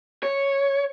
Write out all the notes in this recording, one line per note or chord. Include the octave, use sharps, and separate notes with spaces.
C#5